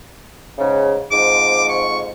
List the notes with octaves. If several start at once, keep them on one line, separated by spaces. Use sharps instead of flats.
G#2 C#3
F2 G#2 D6
C#6